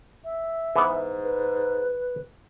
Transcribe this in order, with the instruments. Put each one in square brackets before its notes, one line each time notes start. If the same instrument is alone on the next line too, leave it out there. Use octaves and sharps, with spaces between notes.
[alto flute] E5
[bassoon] G#2 [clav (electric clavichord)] E3 B3
[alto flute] B4